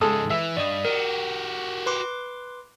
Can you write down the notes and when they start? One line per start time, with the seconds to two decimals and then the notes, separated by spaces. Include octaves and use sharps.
0.01 C#2 G#2 G#3 A4 D#6
0.30 E3 E5
0.57 G2 D5 D#5 D#6
0.85 F#4 G4 A#4
1.86 B4 C6 D6